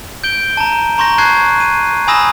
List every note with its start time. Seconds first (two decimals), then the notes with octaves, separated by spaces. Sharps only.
0.24 G6 D7 G7
0.57 A5 A#5
0.98 A#5 C6 C#6 G6 A#6
1.18 A5 C#6 F#6 G#6 C7
1.60 D#7
2.08 G#5 B5 D#6 E6 A#6 E7